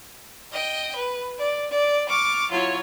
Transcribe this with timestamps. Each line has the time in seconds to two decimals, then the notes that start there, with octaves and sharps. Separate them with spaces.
0.52 D#5 G5
0.96 B4
1.37 D5
1.71 D5
2.08 C#6 D6 F6 A6
2.50 F#3 E4 F4 C#5